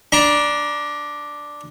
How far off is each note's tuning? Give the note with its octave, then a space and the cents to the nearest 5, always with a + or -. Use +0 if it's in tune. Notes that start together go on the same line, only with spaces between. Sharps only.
D4 +0 A#5 +35